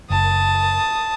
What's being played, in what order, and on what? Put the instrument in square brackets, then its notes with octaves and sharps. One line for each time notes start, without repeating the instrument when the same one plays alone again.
[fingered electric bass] F#1 [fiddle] A5 D#6